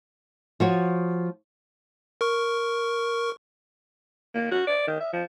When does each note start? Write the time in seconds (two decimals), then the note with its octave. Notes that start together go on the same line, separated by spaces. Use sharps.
0.60 F3 F#4 C#5
2.21 A#4 C#6
4.35 A#3
4.51 F#4
4.67 D5
4.87 D#3
5.00 E5
5.13 F3